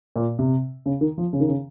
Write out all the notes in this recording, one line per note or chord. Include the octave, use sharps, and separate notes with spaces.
A#2
C3
C#3
D#3
F3
C#3
D#3
C#3